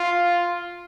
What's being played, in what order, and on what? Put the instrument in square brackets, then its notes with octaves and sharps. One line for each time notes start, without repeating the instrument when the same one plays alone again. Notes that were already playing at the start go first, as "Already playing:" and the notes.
Already playing: [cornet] F4